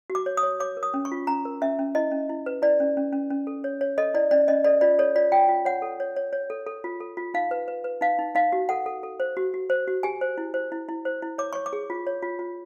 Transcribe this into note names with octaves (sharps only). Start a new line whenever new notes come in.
F#4
D6
C#5
D#6
C#5
C#5 D6
A#4
D#6
C#4
C#6
F4
C#4 A#5
A#4
C#4 E5
C#4
E4 D#5
C#4
E4
B4
E4 D5
C#4
C#4
C#4
C#4
A4
C#5
C#5
A4 D#5
E4 D5
C#4 D5
C#4 D#5
A4 D5
F4 D5
A4 C#5
F4 D5
F4 G5
F4
C#5 F#5
A4
C#5
C#5
C#5
A4
A4
F4
A4
F4
D#4 F5
B4
B4
B4
D#4 F5
D#4
D#4 F5
F#4
A4 F#5
A4
A4
C5
F#4
F#4
C5
F#4
G4 G#5
C5
E4
C5
E4
E4
C5
E4
C#5 D6
C#5 C#6
D6
G#4
F4
C#5
F4
F4